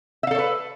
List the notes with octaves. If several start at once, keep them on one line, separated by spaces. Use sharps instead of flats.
A4 B4 C#5 E5 F5